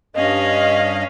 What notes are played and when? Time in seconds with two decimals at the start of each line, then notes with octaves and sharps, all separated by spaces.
0.16 G2 C#4 D#5 F5